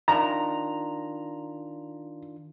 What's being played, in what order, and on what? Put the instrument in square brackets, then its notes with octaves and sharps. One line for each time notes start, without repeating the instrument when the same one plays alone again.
[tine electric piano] D#3 D4 F4 [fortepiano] A#5